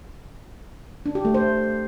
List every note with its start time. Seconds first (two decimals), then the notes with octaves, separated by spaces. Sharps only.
1.06 D4
1.15 G4
1.25 A3
1.34 C5